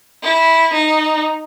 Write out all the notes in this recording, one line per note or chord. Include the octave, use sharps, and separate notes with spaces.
E4
D#4